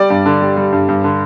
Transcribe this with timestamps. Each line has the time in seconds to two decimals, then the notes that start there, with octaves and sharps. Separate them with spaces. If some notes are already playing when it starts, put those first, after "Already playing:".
Already playing: G3 D5
0.10 G2
0.26 D3
0.41 G3
0.57 G3
0.72 G2
0.89 G2
1.04 D3